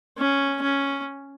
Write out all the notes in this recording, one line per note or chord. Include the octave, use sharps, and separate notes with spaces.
C#4
C#4